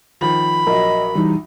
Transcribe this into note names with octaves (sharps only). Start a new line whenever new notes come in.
D#3 F3 B5
A#1 F#3 A#4 D#5
E3 G3 D#4